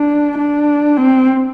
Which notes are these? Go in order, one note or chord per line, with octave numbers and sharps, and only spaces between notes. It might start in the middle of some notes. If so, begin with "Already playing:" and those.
Already playing: D4
D4
C4